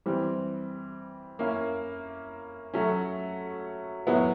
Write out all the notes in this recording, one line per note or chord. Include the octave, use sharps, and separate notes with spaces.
E3 G3 C4
A#3 C#4 E4
F#3 A3 C#4
A2 F#3 B3 E4